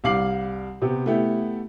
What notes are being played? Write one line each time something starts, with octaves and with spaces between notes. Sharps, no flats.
C2 G3 F5 D6 C7 F#7
C3 B3 G4
A3 B3 E4 G4